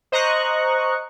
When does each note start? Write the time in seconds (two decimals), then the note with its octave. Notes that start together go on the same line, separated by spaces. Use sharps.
0.12 C5 D#5 A#5 C#6 F#6